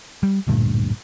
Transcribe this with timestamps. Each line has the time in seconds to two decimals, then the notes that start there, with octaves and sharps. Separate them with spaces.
0.23 G3
0.47 D1 D2 G2 A#2